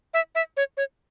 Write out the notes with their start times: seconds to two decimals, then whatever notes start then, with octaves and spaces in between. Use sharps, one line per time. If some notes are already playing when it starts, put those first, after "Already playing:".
0.14 E5
0.35 E5
0.57 C#5
0.77 C#5